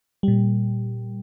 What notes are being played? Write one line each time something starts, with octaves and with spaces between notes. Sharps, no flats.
A#2 G3